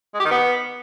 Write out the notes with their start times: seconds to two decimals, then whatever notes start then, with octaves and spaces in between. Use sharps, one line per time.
0.14 G#3
0.20 G4
0.25 D#3
0.31 B3